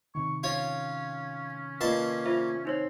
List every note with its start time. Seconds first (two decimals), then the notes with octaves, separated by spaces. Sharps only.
0.15 C3 D#3 C#6
0.43 C#4 F4 C#5
1.81 A#2 F4 B4 D#5 A5 C6
2.26 F4 C5 E5
2.65 C4 D#4 C5 C#5